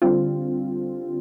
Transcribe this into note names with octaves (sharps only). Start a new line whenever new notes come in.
D3 G3 C4 F4